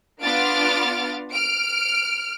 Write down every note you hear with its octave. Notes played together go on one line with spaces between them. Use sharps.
B3 D4 F4 F6 A6 D7
F6 D7